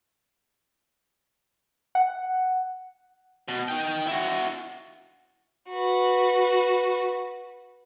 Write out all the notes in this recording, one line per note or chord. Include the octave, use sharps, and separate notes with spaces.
F#5
B2
D#4 G5
E4 F#4
F#4 B4